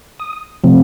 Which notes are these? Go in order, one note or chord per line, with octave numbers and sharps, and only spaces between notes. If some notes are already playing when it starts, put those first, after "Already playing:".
D#6
C3 F3 A3 C4